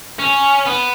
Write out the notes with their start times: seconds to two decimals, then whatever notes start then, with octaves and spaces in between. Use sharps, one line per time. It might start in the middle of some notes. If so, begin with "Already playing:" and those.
0.19 C#4
0.66 B3